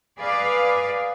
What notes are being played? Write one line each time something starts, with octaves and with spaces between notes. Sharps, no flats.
G#4 B4 D5 F5